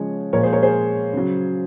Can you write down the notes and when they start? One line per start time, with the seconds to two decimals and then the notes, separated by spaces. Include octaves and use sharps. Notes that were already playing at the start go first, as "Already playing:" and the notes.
Already playing: C#3 F3 G#3 C#5
0.33 A#2 F3 G#3 A#4 C#5
0.43 G#4 C5
0.53 A#4 C#5
0.63 G#4 C5
1.14 C#3 F#3